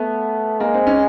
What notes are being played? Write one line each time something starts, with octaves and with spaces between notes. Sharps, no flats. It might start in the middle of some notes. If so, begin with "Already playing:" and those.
Already playing: A3 B3
G#3 A#3
C4
C#4